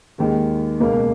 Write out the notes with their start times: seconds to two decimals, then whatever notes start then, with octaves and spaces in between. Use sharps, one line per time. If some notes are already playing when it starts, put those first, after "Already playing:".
0.18 D#2 D#3 G#3
0.80 C#2 B2 A#3